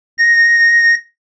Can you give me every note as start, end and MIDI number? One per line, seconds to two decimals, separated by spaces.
0.18 0.95 94